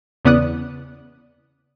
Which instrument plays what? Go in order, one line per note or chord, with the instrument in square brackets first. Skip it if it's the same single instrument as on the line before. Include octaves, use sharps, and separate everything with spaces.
[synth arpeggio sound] E2 C#3 B3 D5 D#6 F#6